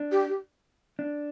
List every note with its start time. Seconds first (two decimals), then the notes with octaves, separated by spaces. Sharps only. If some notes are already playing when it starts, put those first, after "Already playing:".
Already playing: D4
0.12 G4
0.29 G4
0.99 D4